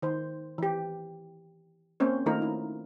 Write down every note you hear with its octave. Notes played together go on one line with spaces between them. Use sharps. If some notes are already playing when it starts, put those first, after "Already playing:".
D#3 C5
E3 G4
A#3 C4 C#4 C5 C#5
D#3 A3 D#4 F4 A#4
E4